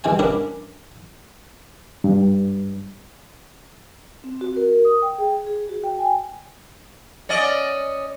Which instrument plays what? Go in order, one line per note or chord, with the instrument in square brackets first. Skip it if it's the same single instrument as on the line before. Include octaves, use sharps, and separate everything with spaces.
[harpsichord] C2 B2 E3 G5 G#5
C#4 D4 E4 A#4 D#5 F#5
[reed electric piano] G2
[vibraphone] C4
F#4
A#4
D#6
G5
G#4
G#4
F#4
G5
G#5
[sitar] C#4 D5 D#5